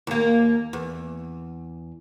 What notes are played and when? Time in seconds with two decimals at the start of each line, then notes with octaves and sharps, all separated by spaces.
0.07 D#2 A#3
0.73 E2